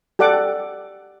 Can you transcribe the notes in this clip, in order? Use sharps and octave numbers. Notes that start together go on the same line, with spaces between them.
G4 A4 D5 F#5 D6